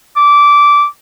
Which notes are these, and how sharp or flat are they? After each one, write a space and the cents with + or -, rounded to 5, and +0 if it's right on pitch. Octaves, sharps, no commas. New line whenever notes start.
D6 -15